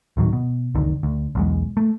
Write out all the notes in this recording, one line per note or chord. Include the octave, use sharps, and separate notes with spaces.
D2 A2 D#3 F#3
B2
F#1 C#2 D3 D#3
D2
B1 E2 G#3
A3